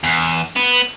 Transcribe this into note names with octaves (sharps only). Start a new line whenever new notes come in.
E2
B3